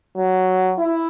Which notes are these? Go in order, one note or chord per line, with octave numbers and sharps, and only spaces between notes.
F#3
E4